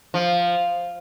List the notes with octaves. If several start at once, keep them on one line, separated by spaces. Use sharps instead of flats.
F3